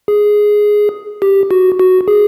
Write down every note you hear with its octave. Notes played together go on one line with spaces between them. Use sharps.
G#4
G4
F#4
F#4
G#4